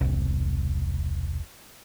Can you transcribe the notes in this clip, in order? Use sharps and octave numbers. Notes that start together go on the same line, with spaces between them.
E1 C2